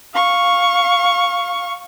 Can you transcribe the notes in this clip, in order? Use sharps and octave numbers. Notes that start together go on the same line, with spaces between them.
F5 C#6